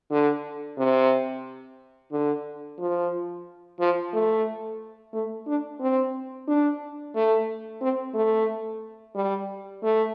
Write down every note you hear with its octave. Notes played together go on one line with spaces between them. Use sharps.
D3
C3
D3
F3
F3
A3
A3
D4
C4
D4
A3
C4
A3
G3
A3